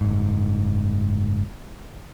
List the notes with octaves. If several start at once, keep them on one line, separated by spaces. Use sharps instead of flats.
F#1 G#2